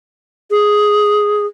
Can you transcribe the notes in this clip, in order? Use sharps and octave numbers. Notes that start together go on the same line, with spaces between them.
G#4